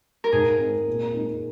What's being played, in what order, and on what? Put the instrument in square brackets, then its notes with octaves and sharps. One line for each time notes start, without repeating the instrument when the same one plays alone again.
[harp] A#4
[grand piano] G#2 [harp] G#4
[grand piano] G#3 C4
A#2
G#3 C4 D#4